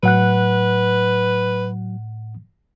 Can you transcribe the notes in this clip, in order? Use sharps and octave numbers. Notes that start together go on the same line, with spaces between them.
A2 F#3 B4 F#5 F#6